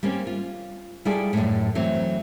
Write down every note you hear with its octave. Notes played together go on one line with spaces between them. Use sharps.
G3 A#3 C4 C#4
F4
G3 E4 F4 G#4 A4 D5
F#2 A2
E3 F#3 A3 C4